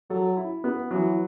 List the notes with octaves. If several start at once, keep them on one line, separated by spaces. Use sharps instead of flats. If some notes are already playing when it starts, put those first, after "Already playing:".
F#3 A4
E4
B3
E3 F#3